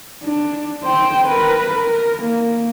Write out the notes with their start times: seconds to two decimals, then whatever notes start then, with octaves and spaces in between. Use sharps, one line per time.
0.24 D4
0.84 C5 G5
1.27 A#4 B4
1.75 A#4
2.23 A#3